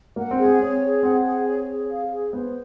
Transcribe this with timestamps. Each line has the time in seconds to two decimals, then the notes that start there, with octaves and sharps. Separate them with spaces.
0.16 A#3 F#5
0.31 C4
0.37 G#4
0.45 C4
0.60 C4 C#5
0.82 G#4
1.03 C4 F#5
1.24 G#4
1.46 C#5
1.69 G#4
1.90 F5
2.11 G#4
2.33 B3 C5